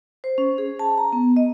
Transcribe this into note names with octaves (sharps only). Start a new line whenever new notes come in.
C5
C#4
G#4
A5
A#5
B3
D#5